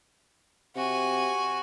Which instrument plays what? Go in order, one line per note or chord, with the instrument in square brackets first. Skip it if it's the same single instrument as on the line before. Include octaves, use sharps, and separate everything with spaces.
[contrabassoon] C3 [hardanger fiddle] F#4 G#5